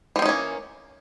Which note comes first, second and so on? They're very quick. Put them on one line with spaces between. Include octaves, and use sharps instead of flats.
E3 C4 D#4 C#4 A#3